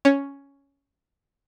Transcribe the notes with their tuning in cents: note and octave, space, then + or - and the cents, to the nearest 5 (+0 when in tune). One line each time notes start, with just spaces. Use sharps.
C#4 +5 C#5 +0